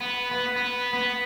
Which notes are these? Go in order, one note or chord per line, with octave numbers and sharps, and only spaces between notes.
B3
B3
B3
B3